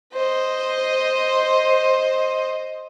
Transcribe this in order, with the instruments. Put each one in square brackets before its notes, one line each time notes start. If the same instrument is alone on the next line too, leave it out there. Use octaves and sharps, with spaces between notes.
[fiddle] C5 D#5